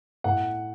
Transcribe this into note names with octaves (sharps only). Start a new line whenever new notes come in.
A2 F#5